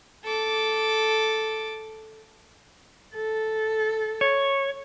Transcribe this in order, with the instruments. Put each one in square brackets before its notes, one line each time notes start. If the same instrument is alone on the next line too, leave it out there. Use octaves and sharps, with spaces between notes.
[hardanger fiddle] A4 D6
[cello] A4
[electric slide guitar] C#5